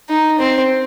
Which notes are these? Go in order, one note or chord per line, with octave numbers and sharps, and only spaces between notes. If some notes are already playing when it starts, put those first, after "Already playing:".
D#4
C4